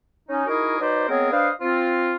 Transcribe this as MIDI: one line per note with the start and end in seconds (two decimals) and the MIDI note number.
0.28 0.46 61
0.28 0.46 63
0.47 0.77 63
0.47 0.77 64
0.47 0.77 66
0.47 0.77 68
0.47 0.77 70
0.80 1.07 54
0.80 1.07 63
0.80 1.07 71
0.80 1.07 72
0.80 1.07 74
0.80 1.07 75
1.08 1.32 56
1.08 1.32 59
1.08 1.32 60
1.08 1.32 68
1.08 1.32 70
1.08 1.32 73
1.32 1.50 62
1.32 1.50 71
1.32 1.50 72
1.32 1.50 75
1.32 1.50 77
1.61 2.15 60
1.61 2.15 65